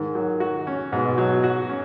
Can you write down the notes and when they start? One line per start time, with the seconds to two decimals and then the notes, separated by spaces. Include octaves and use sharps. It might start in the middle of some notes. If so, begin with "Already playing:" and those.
Already playing: G#2 D#3
0.15 F#3
0.40 F#4
0.67 C#4
0.92 G#2 B2
1.18 F#3
1.44 F#4
1.69 C#4